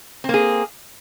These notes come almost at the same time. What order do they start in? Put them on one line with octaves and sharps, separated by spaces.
C4 A#3 G#4